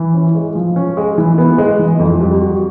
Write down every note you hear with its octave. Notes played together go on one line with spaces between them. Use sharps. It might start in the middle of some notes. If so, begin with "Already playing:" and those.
Already playing: E3
C#4
G#3
F3
C#4
G#3
E3
B3
G#3
E3
F2
G3
F#4